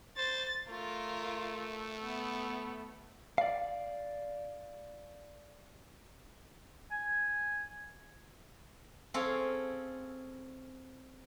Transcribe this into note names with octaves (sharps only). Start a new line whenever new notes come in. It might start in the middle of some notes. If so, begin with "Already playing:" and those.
C5 A6
A3 F4 A#4
B3
D5 F5
G#5
C4 C#4 G#4 A4 F5